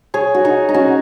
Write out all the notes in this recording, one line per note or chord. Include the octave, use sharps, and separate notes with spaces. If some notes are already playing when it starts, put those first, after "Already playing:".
G#4 C#5
F#4
D#4 G#4
D#4
C#4 F#4